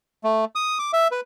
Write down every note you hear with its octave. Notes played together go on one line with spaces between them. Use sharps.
A3
D#6
D6
E5
B4